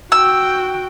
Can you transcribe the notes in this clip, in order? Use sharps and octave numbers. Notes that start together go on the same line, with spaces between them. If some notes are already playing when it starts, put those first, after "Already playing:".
F#4 G5 E6